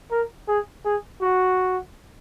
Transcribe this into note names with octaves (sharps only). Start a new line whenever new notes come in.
A#4
G#4
G#4
F#4